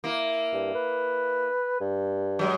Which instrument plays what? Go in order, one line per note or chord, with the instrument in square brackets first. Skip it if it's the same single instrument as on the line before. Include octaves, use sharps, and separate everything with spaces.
[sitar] A#3 E4
[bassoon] G2
B4
G2
[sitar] F#3 G#3